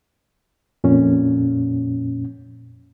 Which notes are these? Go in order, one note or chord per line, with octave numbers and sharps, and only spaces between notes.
F2 A#2 C#4